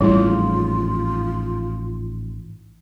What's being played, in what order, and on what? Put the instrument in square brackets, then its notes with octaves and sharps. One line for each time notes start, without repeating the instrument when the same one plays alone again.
[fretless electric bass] A1 F2 G#2 [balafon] G3 E4 [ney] F4